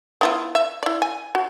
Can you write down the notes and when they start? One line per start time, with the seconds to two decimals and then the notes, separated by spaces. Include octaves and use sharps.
0.21 B3 E4 F4
0.55 E5
0.83 E4 D5
1.02 G#5
1.35 F#4